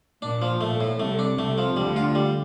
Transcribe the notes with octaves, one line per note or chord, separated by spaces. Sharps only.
A#2 D4
F3
A#2 A3
A2
C2 C3 A3
D4
C2 C3 A3
F3
D2 D3 G3
F4
G3